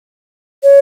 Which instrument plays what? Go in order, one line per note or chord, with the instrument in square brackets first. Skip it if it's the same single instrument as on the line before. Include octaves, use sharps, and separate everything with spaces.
[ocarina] C#5